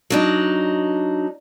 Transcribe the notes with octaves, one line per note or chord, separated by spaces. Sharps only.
F#3 D4 D#4